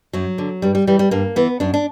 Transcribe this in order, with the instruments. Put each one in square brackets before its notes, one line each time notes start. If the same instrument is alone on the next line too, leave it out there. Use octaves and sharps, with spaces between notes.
[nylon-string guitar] F#2 F#3
D3
G2 G3
G3
E3 G3
G3
G2 A#3
E3 B3
F#2 D4
D4